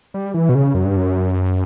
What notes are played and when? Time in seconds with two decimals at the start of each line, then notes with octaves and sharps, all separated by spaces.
0.14 G3
0.34 E3
0.49 B2
0.55 C#3
0.75 F#2
0.85 G2
0.96 F#2